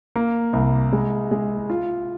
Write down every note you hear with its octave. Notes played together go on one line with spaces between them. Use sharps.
A#3
C2
G#3
G#3
F4